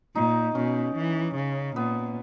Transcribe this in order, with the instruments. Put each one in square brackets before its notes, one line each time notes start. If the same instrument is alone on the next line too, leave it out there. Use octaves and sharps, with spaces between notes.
[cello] A#2 [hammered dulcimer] D#4
[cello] B2 [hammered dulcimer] C#4
[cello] E3
C#3
[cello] A#2 [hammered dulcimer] B3